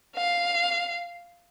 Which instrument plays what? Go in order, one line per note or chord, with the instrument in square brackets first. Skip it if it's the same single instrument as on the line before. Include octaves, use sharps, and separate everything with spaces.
[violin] F5